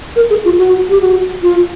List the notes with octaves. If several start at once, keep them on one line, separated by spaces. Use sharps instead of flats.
A#4
G#4
F4
F#4
G4
F#4
F4